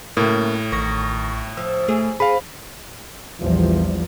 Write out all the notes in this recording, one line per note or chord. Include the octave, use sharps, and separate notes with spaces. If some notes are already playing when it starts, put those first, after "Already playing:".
A2 C#3 F#3 A#3
A1 D#3 C#6 A#6
F3 E6
A3 G#4
C4 G#4 F5 B5
A#1 E2 F3 G3